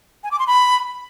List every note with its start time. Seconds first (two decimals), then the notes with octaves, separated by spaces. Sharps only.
0.24 G#5
0.31 D6
0.39 C6
0.47 B5